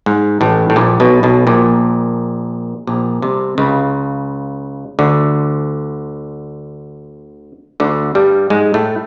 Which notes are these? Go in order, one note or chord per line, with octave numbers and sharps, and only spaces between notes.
G#2
A1 A2
A2
A#1 A#2
B1 B2
B1 B2
A#1 A#2
A#1 A#2
C2 C3
C#2 C#3
D2 D3
D2 D3
G2 G3
G#2 G#3
A2 A3